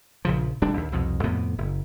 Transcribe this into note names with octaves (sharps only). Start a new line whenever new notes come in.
A#1 C#3 F3
D#1 G3 D4
D#2
C2 F2 B2
F2 A2 C3 B3
F#1